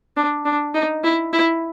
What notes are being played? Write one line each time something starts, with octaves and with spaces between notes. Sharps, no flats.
D4
D4
D#4
E4
E4